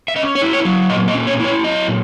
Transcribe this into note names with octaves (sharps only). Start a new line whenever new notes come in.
E5
C#4 D#5
C#5
E4
C#5
F#3
A#2 D#5
D#5
C#4
C#5
E4
C#5
F#3 D#5
A#2